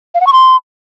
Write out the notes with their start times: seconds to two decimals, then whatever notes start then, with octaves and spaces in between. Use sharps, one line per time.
0.15 F5
0.21 F#5
0.27 C#6
0.33 C6